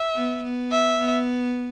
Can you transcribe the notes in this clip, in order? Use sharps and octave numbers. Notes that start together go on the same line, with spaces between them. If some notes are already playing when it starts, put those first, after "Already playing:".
Already playing: E5
B3
B3
E5
B3